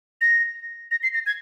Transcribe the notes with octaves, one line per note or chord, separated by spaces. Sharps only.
A#6
A#6
C7
A#6
G#6